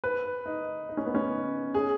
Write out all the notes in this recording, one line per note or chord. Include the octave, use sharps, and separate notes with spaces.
B4
D#4
D#4
C#4
B3
C#4
G#4